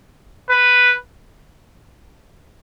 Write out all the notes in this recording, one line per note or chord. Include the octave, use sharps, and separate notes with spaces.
B4